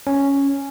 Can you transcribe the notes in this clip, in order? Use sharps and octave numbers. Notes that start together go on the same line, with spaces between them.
C#4